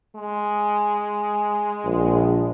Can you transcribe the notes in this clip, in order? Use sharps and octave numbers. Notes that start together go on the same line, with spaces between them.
G#3
A#1